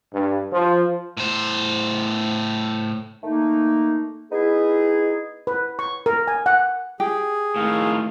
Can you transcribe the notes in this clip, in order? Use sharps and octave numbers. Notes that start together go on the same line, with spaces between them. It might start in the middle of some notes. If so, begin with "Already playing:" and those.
G2
F3
A2 C5
D#3 A3 A#3 D#4
B3 D#4 E4 G#4
B4
C#6
A#4
G#5
F#5
G4 G#4
A2 D#3 F5